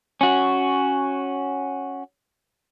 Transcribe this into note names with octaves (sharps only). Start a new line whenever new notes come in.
C#4 F#4